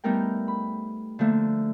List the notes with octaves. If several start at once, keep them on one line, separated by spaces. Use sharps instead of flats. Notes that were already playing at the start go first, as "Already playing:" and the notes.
G3 A3 B3 D#4 A#4 G5
B5
D3 F3 A3 A#3